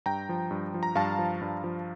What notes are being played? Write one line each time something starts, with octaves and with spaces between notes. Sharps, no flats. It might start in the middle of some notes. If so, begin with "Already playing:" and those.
G2 G5 A#5
F3
G2
F3
A#5
G2 F5 A5
F3
G2
F3